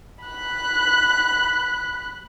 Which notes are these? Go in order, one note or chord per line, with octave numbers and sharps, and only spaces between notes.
B5 F#6